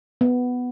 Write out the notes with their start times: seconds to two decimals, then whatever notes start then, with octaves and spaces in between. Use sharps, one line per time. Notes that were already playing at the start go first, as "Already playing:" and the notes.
0.21 B3